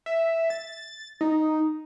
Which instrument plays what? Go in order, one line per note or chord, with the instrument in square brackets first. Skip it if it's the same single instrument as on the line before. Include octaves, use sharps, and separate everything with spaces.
[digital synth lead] E5
A6
D#4